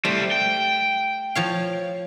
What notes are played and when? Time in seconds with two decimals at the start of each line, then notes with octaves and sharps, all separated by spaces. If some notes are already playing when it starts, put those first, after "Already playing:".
0.05 G3 A3 C5
0.32 G5
1.35 F3 C#5 F5